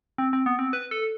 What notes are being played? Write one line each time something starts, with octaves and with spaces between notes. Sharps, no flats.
C4
C4
B3
C4
B4
A4